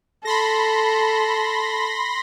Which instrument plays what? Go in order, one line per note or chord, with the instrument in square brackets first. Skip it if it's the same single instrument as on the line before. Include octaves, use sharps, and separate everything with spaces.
[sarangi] A4 [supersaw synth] B5 C6 A#6